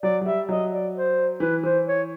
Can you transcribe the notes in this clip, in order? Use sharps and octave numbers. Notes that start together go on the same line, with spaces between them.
F#3 D5
F#3
G3 E5
F#3 D#5
D5
C5
E3 B4
E3 C5
C#5